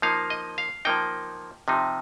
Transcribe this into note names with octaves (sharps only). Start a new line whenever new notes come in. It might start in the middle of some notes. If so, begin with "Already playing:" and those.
F3 A#3 D#4 F5
D#5
F5
F3 A#3 D#4 G5
C3 F3 D#4